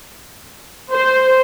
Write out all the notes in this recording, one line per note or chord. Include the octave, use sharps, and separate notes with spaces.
C5